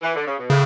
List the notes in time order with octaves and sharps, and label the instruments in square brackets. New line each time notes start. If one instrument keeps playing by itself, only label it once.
[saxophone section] E3
D3
C#3
B2
[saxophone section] A2 [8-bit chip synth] C#3